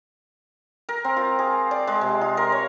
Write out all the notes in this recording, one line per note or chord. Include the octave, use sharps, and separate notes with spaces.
A#4
C4
F4
G#4
D5
G#3
C3
F4
A#4
C#5